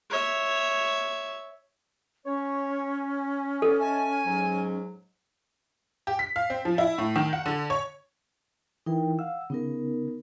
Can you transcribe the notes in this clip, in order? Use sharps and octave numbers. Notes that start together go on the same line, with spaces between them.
C#5 E5
C#4 C#5
C3 B3 A4 D5
D#5 E5 G#5 A5
G#2 F#3
G4
B6
F5
C4
F3
E4
A2
D#3
F#5
D3
C#5
E3 D#4 E4 A#4 G5
F5 F#5 E6
C#3 B3 D#4 A#4